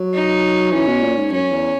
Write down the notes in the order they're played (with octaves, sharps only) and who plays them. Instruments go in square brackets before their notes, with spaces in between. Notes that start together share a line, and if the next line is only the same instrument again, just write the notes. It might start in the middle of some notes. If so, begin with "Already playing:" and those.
Already playing: [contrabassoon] F#3
[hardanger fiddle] D#4
[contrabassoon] E3 [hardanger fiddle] C#4
[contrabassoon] B2
A#2
G#2
[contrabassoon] F#2 [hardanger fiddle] C#4
[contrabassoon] E2